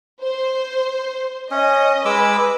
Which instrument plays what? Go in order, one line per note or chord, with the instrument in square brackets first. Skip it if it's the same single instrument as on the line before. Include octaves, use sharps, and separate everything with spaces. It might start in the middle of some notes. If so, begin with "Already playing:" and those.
[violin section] C5
[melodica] C#4 [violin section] D#5
[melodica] G#3 D6 E6 [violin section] B4